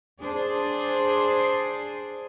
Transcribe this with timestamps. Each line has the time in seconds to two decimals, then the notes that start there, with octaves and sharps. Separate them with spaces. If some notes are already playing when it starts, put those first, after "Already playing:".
0.20 D4 G#4 C5